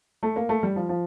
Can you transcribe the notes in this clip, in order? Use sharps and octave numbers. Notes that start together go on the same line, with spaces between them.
A3
A#3
A3
G3
F3
F3